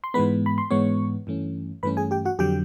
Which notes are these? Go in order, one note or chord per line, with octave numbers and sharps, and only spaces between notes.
C6
G#2 E3 G#3 B3 B4 B5
B5
C6
G#2 E3 G#3 B3 C#5 C#6
G2 E3 A3 C#4
G2 E3 A3 C#4 B4 B5
G#4 G#5
G4 G5
F#4 F#5
F2 D3 F#3 G4 G5